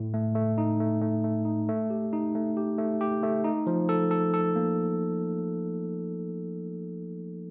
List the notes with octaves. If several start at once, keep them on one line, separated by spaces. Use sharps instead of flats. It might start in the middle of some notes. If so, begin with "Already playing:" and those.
Already playing: A2
A3
A3
D#4
A3
A3
A3
D#4
A3
G4
D#4
A3
G4
A3
G4
A3
D#4
F3
A4
A4
A4
A#3